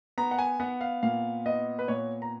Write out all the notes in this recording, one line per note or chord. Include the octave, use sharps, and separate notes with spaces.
B3 A#5
F#5
G#5
B3 F#5
F5
A#2 F5
B3 D#5
B4
A#2 C#5
A#5